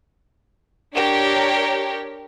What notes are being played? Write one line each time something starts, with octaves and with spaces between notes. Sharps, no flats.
D4 G4 A#4 C#5